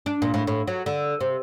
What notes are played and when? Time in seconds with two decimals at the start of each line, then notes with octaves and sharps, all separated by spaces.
0.06 D4
0.22 A#2
0.34 A2
0.47 A2
0.67 F#3
0.86 D3
1.21 C3